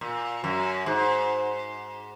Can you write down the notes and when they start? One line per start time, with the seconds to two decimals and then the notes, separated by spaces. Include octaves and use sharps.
0.01 A#2
0.44 F#2
0.86 G#2